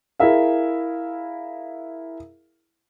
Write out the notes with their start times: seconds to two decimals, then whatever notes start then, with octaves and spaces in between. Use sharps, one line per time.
0.20 E4 G#4 A#4 E5 F5